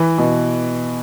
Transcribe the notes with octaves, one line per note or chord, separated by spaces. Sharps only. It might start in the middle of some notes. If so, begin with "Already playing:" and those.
Already playing: E3
B2